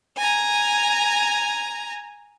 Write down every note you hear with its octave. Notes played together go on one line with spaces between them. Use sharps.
G#5 A#5